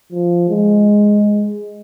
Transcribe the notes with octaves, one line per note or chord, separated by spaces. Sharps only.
F3
G#3